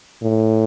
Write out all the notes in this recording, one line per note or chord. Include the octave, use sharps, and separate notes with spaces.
A2